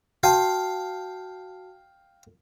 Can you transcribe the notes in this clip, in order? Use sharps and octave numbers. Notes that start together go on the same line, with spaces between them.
F#4 F5 G5 A5